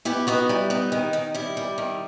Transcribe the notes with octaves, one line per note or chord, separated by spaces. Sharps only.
B3 E4 G4
B3 D#4 F#4
G3 E4
B3 D#4
D#3
D#3
G3 E4
G3
D#3